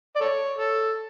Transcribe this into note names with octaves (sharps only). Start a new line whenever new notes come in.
D5
A4 C#5
A4